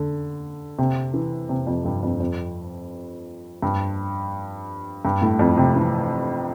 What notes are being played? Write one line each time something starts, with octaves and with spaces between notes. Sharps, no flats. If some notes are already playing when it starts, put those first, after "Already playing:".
Already playing: D3
C3
E3
C3
F2
G2
F2
F2
G2
G2
A2
F2
C3
E3